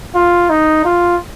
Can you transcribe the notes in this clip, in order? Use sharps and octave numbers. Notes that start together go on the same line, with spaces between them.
F4
D#4
F4